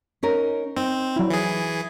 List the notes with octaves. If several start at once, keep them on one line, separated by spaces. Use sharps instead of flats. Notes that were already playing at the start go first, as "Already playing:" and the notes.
C#4 D#4 A#4
C4 D#4
F#3 E4
E3 G#4